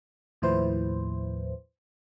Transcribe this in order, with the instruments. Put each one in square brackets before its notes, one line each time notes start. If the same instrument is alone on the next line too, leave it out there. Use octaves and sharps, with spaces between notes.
[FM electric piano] D#2 A2 F3 E4 B4 C5